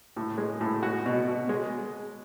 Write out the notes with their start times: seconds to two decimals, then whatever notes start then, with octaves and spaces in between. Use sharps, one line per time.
0.16 A2
0.38 G#3
0.61 A2
0.82 G#3 F#4 F#5
1.06 B2
1.28 B2
1.49 G#3